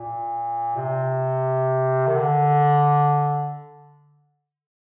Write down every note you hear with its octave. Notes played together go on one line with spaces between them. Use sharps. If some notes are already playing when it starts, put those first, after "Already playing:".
Already playing: A#2
C3
D#3
D3